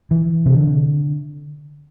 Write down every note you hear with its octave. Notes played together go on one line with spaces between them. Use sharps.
E3
C3
D3